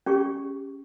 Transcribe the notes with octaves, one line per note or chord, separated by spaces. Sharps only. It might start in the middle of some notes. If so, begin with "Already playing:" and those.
C#4 G4 G#4 C#6